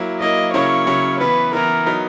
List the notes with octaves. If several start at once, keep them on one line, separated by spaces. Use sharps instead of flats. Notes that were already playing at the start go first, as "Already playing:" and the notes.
Already playing: F#3 A#3 E4
F#3 A#3 E4 D#5
C#3 F#3 A#3 C#4 E4 C#5
C#3 F#3 A#3 C#4 E4
E3 B3 E4 B4
E3 B3 E4 A#4
F#3 B3 D#4